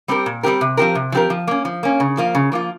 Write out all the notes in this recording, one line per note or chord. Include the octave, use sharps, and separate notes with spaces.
G3 C4 G4 A#4
A#2
G3 C4 G4 A#4
C3
F3 C4 G4 A#4
C3
F3 C4 G4 A#4
F3
A#3 C#4
F3
A#3 C#4
C#3
F3 A#3 F4
C#3
F3 A#3 F4